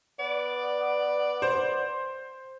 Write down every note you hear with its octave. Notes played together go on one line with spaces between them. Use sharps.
B3 D5
C5